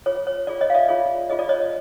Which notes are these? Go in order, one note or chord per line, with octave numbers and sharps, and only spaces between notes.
F4 G#4 C#5
C#5
F4 G#4 C#5 D5
C#5 D#5
F5
D5 E5
F4 G#4 C#5
F4 G#4 C#5 D#5
D5
C#5 D#5